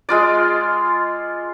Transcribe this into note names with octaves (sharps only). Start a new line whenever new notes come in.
G#3 F4 D5